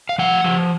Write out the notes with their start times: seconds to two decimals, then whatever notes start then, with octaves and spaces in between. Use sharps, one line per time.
0.09 F5
0.18 F3 F#5
0.44 F3